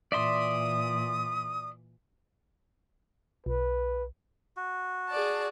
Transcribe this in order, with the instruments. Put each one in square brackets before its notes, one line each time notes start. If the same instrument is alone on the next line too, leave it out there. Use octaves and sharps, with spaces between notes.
[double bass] A#2 E3 [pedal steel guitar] D5 E5 C6 [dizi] D#6
[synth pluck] B1 [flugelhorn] B4
[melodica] F#4
[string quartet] G#4 D5 A5